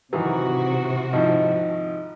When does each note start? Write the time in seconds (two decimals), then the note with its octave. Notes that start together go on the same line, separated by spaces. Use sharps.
0.13 C3 D#3 E3 F#3 F#4
1.13 G#1 F3 D#4 E4 D#5